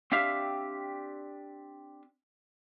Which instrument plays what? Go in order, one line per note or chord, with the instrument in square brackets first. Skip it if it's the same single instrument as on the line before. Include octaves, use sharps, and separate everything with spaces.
[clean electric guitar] C4 D4 G4 E5 F5